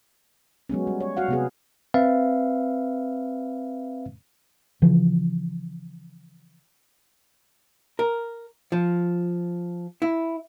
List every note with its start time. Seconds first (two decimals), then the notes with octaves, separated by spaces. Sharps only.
0.69 F#3 G#3 B3 C#4
0.87 G3
1.01 C#5
1.17 F#4 F5 F#5
1.28 C3 B3 G#4
1.94 C4 B4 E5 F5
4.82 C#3 E3 F3
7.99 A#4
8.72 F3
10.02 E4